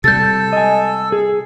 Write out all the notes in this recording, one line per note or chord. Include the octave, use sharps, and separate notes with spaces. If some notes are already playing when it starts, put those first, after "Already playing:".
C3 G3 A4 G6 A6
D#5 G#5
G#4